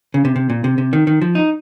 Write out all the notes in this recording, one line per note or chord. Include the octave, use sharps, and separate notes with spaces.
C#3
C3
C3
A#2
C3
C3
D#3
D#3
F3
D#4